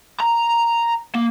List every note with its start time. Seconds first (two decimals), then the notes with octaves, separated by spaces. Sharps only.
0.20 A#5
1.15 A#3